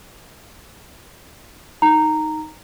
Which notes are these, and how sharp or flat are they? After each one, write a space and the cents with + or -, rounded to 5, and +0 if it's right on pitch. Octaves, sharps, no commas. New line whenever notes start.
D#4 +5 A#5 -10